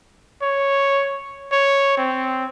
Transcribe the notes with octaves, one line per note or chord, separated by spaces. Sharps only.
C#5
C#5
C4